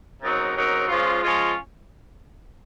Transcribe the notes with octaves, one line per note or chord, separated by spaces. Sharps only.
C#3 F#3 C4 D#4 A#4
C#3 F#3 C4 D#4 A#4
F3 G#3 C#4 F4
F3 G#3 C#4 F4